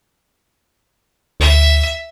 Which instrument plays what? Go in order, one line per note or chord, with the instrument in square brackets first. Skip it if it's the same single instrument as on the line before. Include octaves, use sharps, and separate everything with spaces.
[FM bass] D2 [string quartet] E5